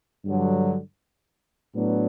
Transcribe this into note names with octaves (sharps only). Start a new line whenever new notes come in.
G2 D3 F#3
A2 F#3 B3 D4